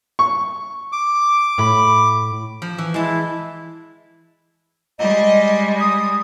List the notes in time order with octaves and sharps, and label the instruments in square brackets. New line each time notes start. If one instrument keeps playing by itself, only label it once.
[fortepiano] C#6
[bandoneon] D6
[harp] A2 B5
[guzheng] F3
E3
[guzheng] G#3 A5 [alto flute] E4
[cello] G3 G#3 [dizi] D#5
[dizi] D#6